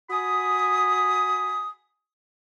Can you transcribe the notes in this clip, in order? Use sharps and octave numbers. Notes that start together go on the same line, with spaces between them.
F#4 G#5 B5 D#6